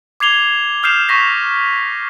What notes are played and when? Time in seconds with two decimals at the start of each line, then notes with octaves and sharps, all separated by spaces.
0.20 D6 G#6 C7 F7 G7
0.83 D#6 F6 G6 C7 E7 F7
1.09 C#6 D#6 A#6 B6